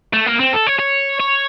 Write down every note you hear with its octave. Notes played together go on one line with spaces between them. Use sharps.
A3
A#3
C4
A4
C#5
C#5
C#5